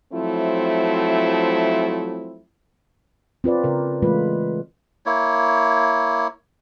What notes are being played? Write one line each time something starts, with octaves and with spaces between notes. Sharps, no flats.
F3 F#3 A3 C4 E4
C4 F4 B4 D5
C#3 A#4
E3 G#3 A3 F4 B4
A#3 E4 C#5